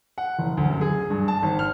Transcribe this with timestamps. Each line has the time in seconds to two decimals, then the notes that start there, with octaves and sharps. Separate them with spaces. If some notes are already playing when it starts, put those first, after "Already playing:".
0.18 F#5
0.39 F#1
0.57 D2
0.70 F#2
0.81 G#4
1.10 G2
1.28 A5
1.43 G#1
1.59 F6